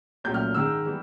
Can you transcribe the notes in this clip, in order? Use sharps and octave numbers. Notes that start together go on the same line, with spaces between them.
C2 A#2 F#3 A3 C#4 G6
F6
G#2 D#3 G#3 E6
E3 G3 B3